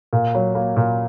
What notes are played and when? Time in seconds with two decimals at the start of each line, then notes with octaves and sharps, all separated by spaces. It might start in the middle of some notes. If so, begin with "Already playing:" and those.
0.13 A#2
0.35 F#3
0.55 A#3
0.77 A#2